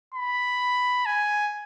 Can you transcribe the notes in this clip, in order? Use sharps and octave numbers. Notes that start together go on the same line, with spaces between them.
B5
G#5